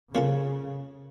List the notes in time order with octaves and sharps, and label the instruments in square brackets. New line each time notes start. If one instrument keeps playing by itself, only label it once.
[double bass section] C#3 [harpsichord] F3 A#3 C#4 F4 A4